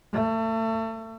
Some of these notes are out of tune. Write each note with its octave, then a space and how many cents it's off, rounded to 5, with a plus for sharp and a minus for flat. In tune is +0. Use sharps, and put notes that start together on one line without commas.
A3 +30